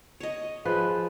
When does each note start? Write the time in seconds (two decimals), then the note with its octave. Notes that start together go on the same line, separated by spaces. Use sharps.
0.20 C#5 D#5
0.65 F3 G#4 B4